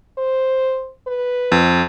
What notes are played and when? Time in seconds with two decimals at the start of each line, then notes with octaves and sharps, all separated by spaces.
0.18 C5
1.07 B4
1.52 F2